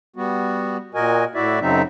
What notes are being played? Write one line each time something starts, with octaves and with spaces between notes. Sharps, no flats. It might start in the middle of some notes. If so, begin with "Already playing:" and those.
G3 B3 F#4
A#2 F#4 A#4 D#5 G#5
A2 E4 F#4 D5 E5
F#2 C#3 F#3 C4 D#4 E5